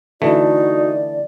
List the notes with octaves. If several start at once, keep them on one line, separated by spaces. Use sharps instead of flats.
D3 E3 A3 D#4 F#4 D5